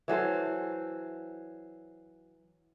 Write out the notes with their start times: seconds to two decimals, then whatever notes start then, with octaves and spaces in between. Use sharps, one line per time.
0.08 E3 F#3 A4 C5